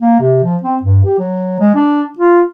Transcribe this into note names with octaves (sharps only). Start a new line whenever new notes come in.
A#3
C3
F3
C4
G2
G4
F#3
G#3
D4
F4